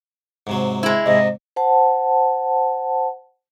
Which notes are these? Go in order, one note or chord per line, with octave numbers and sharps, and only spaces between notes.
G#2 C3 F#3
G#3 E4
G#2 C3 D#5
C5 F#5 A5